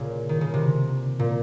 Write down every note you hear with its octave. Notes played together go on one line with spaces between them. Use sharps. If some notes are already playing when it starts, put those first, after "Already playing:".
Already playing: A#2 C#3
D#3
C#3
C3
A#2